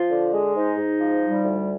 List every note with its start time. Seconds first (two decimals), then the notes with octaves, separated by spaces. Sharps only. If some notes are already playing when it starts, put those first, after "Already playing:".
Already playing: F3 F4
0.11 D3
0.33 G#3
0.55 G#2 D#4
0.78 G#2
1.00 F3
1.21 G3
1.43 D2